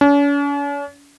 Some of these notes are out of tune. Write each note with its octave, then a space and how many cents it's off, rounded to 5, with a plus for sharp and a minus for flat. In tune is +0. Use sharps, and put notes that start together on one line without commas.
C#4 +45